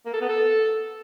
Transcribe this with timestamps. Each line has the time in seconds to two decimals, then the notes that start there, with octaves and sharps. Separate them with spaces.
0.06 A#3
0.13 A4
0.21 B3
0.29 A4